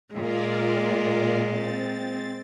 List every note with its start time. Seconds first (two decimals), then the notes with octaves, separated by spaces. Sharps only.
0.14 A#2 G#3 F4 A#4 D5
1.48 C4 A6